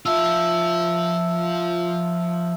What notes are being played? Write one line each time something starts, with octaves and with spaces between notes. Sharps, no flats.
F3 F4 E5 A5 E6